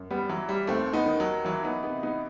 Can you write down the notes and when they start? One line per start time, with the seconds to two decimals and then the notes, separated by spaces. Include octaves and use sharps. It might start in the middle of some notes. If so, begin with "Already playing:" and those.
Already playing: F#2
0.10 G3 B3
0.29 E3 F#3
0.49 G3
0.67 D#2 A3 C4
0.93 B3 D#4
1.06 D#3
1.20 F#3
1.44 E3 F#3
1.64 B3 D#4
1.83 C3 B3 D#4
2.03 B3 D#4